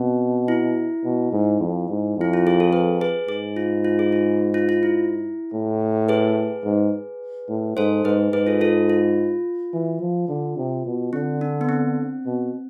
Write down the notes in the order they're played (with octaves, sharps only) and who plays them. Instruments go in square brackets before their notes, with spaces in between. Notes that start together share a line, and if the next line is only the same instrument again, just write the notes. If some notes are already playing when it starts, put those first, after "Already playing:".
Already playing: [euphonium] B2 [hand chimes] C4
[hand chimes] E4
[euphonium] B2
G#2
F2
G#2
[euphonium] F2 [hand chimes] E4
[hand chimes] F4
G#4
A4
G#4 B4
G#4 B4
[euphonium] G#2 [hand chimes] G#4
[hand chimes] F4
F4
G#4
F4
F4
F4
E4
[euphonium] A2
[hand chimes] G#4 B4
[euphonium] G#2
A2
[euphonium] G#2 [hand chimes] A4 C5
[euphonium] G#2 [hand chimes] G#4 B4
[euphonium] G#2 [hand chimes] G#4 B4
[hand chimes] F4 A4
F4 A4
F4
[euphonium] E3
F3
D3
C3
B2
[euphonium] D3 [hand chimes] C4
[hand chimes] D4
B3
C4
[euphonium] B2